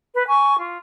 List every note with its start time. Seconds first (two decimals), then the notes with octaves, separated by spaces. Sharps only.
0.14 B4
0.28 G#5 C#6
0.58 F4